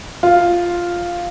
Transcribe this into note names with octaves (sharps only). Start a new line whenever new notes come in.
F4